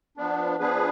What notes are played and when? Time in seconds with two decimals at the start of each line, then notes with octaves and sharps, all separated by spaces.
0.17 F3 B3 D4
0.59 F3 B3 D4 G#4 B4